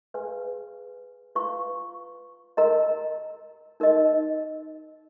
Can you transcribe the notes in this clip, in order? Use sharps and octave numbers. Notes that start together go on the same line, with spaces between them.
G#4 B4 F5 G#5
F4 B4 F5 A#5 C#6
A#4 D#5 A#5
D#4 A#4 D#5